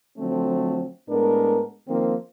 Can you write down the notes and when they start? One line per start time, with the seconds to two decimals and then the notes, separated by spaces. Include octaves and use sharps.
0.18 D3 F3 F#3 A3 C4
1.09 A2 G#3 B3 D4 A#4
1.87 D#3 F3 A#3 C4